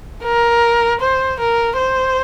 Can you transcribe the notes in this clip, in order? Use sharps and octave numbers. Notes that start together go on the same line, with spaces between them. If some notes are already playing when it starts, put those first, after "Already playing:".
A#4
C5
A#4
C5